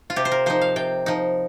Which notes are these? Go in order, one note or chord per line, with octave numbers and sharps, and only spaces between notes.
F4
C3 G4
C5
A#4
F3 D#4 C5
F5
C3 G5
F3 D#4